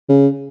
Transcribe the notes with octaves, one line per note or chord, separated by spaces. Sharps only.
C#3